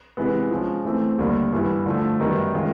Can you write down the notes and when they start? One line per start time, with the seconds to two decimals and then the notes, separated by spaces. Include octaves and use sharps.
0.17 C3 E3 G#3 B3
0.51 F3 G#3 C#4
0.85 E3 A3 C4
1.18 D#2 D3 G3 A#3
1.53 G2 E3 G3 B3 E4
1.86 D3 F3 A3
2.20 F#2 D#3 G3 B3 D#4
2.54 D#3 G#3 C#4 F4